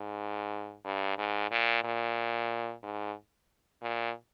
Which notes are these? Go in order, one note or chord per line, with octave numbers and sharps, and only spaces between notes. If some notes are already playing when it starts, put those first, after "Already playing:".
Already playing: G#2
G2
G#2
A#2
A#2
G#2
A#2